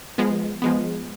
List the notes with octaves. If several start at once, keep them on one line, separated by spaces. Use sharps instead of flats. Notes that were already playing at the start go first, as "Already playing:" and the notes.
F3 G#3 B3
F3 G#3 B3